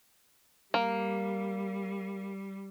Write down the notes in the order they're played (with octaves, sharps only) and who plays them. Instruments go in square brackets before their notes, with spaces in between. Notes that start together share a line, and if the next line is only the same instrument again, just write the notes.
[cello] G3 [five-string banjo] A#3